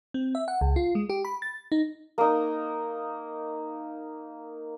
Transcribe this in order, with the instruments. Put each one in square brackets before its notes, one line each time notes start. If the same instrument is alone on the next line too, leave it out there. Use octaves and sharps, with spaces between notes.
[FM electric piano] C4
E5
F#5
C#2
F4
G#3
G4
B5
A6
D#4
[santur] A#3 D#4